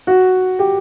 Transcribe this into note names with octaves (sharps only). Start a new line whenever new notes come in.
F#4
G4